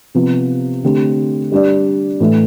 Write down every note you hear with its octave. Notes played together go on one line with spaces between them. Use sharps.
C3 F3 B3
D3 A3 C4 G4
G3 D4 G4 D5
A2 E3 A3